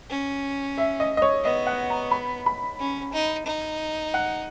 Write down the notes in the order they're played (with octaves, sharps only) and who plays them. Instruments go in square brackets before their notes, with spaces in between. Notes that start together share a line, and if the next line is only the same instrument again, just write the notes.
[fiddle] C#4
[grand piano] E5
D#5
D#5
C#5
[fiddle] B3 [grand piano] D#5
[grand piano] F#5
A#5
B5
B5
[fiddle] C#4
D#4
D#4
[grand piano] F#5